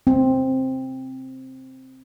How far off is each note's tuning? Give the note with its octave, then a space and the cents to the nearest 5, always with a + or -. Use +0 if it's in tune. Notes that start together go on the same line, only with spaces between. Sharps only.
C4 +5